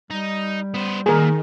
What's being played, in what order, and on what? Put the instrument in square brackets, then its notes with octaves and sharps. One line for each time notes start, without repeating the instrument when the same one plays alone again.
[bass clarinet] G3 [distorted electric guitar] D#4
[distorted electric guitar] B3 C5
[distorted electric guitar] A#2 [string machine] D#3 [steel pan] G#4 A#4